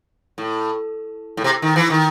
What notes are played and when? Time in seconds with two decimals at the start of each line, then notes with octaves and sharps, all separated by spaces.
0.38 A2
1.37 A2
1.44 C3
1.62 D#3
1.76 E3
1.90 D#3